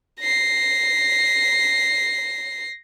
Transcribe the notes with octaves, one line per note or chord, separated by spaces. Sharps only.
A#6 C7